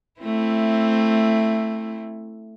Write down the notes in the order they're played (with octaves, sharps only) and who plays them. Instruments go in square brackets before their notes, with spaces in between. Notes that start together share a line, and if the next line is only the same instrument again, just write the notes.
[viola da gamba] A3 C4 E4